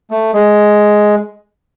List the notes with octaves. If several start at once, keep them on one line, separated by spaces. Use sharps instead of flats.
A3
G#3